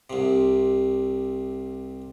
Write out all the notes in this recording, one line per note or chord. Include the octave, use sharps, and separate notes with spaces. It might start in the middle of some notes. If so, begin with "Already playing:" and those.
C2 C3